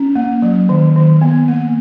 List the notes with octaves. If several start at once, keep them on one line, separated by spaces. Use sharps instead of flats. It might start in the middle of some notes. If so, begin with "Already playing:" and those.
Already playing: C#4
A#3
F#3
D#3
D#3
B3
A#3